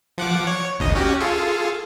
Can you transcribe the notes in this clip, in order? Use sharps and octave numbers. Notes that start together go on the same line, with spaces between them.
F3 F#5 D6
C#5
G#1 D2 D#5
C#4 F#4 G4
F4 G#4 A4